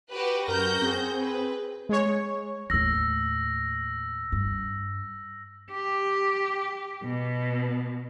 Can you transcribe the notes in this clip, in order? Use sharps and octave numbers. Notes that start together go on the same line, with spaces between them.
F#4 G4 B4
F#2 F#4 A#4 G6 A#6
C4 G#4
B4
G#3 C#5
D#2 A2 E6 A#6
G2
G4
B2